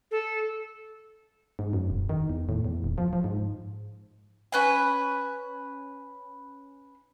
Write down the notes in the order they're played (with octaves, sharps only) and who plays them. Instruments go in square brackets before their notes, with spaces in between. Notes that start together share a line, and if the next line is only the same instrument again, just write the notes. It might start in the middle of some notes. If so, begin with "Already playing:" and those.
[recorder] A4
[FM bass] G#2
F#2
E1
D#3
E2
A2
E2
D#1
F3
F3
G#2
[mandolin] C#4 B4 G#5